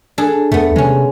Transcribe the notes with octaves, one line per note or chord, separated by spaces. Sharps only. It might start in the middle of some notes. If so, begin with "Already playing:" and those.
D4 G#4 A4
E2 A3 B3
C3 G#3 C#4